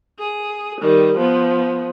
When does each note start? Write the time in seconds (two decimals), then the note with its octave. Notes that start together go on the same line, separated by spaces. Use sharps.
0.19 G#4
0.81 D#3 G3
1.17 F3 B3